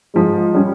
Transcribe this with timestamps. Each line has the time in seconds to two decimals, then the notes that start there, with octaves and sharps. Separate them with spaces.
0.14 G#2 F3 G#3
0.54 G3 C#4